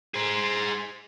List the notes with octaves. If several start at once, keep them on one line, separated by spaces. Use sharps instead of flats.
G#4 C5